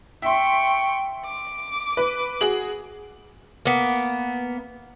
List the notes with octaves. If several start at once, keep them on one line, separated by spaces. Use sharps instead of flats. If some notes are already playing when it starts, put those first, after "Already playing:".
E5 G5 C6 C#6
D6
B4
F#4 G#4 F#7
A#3 B3